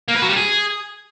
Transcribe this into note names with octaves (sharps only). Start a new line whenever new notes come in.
A#3
B4
F#3
G3
G#4